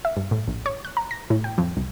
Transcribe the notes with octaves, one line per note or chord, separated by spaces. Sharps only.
E5
G2
A2
A#1
C#5
F#6
A#5
A#6
A2
G5
F2
C2